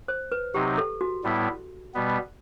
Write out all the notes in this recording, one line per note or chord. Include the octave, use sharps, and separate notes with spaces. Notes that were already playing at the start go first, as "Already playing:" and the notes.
C5
B4
C3 F#3 C4 D#4 G4
A4
F#4
A2 G3 B3 E4
B2 G3 B3